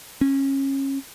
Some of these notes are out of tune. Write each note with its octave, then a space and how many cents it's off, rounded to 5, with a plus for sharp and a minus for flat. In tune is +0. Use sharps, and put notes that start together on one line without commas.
C#4 -25